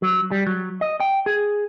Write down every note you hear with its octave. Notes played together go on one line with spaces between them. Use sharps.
F#3
G3
F#3
D#5
G5
G#4